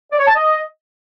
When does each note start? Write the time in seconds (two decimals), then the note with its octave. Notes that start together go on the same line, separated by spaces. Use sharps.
0.11 D5
0.19 C#5
0.27 A5
0.35 D#5